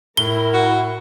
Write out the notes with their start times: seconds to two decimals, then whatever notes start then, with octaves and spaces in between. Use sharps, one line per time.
0.17 A2 E4 A#4 G7
0.53 F#4